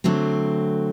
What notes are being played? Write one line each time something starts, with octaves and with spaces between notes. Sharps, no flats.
D3 F#3 A3 C4